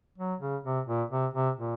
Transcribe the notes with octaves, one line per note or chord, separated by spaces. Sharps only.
F#3
C#3
C3
A#2
C3
C3
A#2